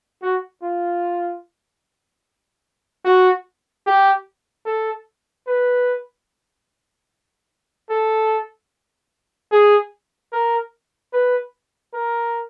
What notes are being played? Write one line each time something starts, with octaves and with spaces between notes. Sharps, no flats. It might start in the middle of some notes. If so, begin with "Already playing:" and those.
F#4
F4
F#4
G4
A4
B4
A4
G#4
A#4
B4
A#4